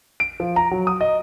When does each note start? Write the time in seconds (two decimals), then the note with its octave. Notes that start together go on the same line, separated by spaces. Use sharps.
0.20 D7
0.40 F3
0.56 A#5
0.71 F#3
0.87 D#6
1.01 D#5